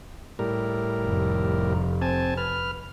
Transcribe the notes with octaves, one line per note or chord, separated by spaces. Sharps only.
A2 G3 A#4
F1
C4 G#5 A5
B4 F6